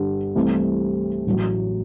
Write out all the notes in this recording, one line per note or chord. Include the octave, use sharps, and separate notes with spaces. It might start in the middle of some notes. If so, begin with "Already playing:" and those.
Already playing: G1 G2 D3 G3
C2 C3 E3 A3 C4
A1 A2 F#3